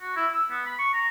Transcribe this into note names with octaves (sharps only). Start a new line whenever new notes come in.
F#4
E4
E6
B3
B5
C#6
A#5